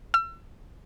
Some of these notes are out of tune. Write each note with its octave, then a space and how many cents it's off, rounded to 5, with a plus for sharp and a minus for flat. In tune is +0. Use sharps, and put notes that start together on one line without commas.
E6 +40